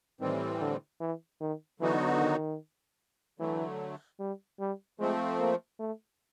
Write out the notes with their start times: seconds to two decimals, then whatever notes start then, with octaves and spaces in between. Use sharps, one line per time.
0.20 A2 D#3 E3 G3 C4
0.61 D3
1.00 E3
1.40 D#3
1.80 D3 E3 F#3 B3 D#4 F#4
2.20 D#3
3.39 D3 E3 F#3 A3
4.20 G3
4.60 G3
4.99 F3 G#3 A3 C4
5.39 A#3
5.79 A3